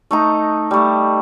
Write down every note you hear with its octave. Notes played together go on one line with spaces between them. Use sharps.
A3 D#4 A#5
G3 A3